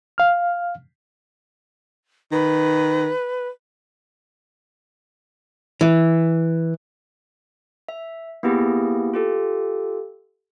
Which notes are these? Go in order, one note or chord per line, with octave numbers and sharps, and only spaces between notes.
F5 F6
D#3 B4
E3
E5
A#3 B3 E4 G4 G#4
F4 G4 A4